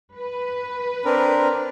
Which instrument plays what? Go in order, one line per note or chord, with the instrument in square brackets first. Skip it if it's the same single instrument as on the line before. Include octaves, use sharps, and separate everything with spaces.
[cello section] B4
[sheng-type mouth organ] C4 D4 A#4